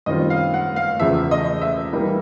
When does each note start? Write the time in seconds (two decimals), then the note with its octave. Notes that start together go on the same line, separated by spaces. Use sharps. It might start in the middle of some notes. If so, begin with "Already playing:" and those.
0.06 F#2 D#3 G3 C4 F4 D#5
0.30 F5
0.54 F#5
0.76 F5
1.00 E2 C#3 F3 E5
1.31 D#5
1.62 E5
1.93 E3 G3 A#3 D#4